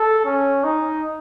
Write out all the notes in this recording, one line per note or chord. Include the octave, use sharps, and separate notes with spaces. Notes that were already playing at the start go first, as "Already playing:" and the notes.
Already playing: A4
C#4
D#4